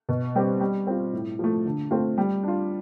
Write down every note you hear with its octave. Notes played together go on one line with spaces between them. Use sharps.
B2
G3 C4 G4
G3
C4 F4
A2
F3 A3
D3
A3 C4 F4
G3
D4 F4